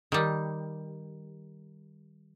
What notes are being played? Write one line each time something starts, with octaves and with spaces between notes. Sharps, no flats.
D#3 G3